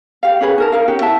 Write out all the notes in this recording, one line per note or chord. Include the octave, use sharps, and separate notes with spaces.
G4 F5
C#4 F#4 G#4 B4
D#4 A#4 A5
D#4 A#4 F5
C#4 F#4 G4
E4 E5 A5